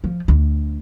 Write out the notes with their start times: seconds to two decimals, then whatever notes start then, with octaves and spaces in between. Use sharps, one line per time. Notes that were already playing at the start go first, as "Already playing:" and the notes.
0.04 F3
0.28 D2